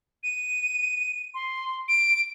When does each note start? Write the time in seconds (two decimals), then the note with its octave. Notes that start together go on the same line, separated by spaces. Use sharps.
0.23 D#7
1.34 C6
1.88 D7